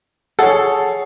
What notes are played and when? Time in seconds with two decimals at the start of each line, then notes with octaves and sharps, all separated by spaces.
0.39 G#4 A4 C#5 F#5